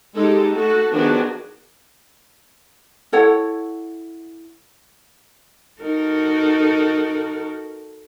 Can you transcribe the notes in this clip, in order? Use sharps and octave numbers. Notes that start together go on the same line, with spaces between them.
G#3 D#4 G4 A4
A3 F#4 A4
D#3 F3 B3 D4 F#4 G#4
E4 A4 C#5 F#5
D#4 F#4 A4 A#4